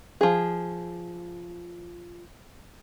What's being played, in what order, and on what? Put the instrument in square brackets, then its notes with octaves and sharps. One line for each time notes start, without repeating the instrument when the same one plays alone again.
[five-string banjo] F3 G#4